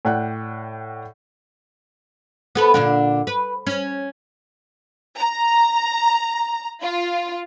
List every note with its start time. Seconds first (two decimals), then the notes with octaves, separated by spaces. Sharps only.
0.05 A2 D5 F#5 G5 F#6
2.55 B3 A4 B4
2.74 A#2 D3 D4
3.27 B4
3.67 C#4
5.17 A#5
6.82 F4